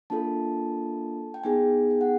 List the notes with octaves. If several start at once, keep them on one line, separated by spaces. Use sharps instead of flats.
A#3 D4 F4 A4 A5
G5
B3 D#4 G#4 G#5
G5
F#5